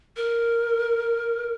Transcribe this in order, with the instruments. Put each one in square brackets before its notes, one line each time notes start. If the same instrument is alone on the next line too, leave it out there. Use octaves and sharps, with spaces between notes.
[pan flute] A#4